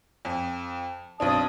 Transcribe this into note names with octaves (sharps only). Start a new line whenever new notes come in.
F2
B1 C4 D4 A5 D#6